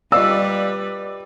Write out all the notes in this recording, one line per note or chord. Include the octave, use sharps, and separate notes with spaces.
G3 F4 B4 D5 D#5 F5 E6